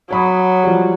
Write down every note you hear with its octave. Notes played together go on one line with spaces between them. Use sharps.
F#3 C#5 B5 D#6
F3 G3